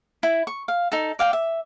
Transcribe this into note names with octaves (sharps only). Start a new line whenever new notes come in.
E4
C#6
F5
D#4 A4
D5 F5 G5
E5